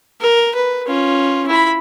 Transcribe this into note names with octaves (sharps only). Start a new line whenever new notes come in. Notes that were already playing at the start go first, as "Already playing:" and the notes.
A#4
B4
C#4 F4
E4 B5